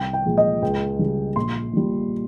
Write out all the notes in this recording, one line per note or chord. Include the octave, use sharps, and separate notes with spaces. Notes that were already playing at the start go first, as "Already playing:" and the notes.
Already playing: C2 G5
G5
A#2 F3 G#3
D#5
C#2 G5
C#3 G3
A#1 C6
A#2 G3